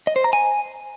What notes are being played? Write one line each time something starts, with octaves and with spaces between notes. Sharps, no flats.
D#5
C5
A#5
G#5